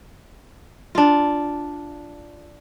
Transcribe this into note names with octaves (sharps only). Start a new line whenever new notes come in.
D4 F4